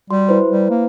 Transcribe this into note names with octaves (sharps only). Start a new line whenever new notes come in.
G3 F#4 C6
E4 B4 C5
G3
A#3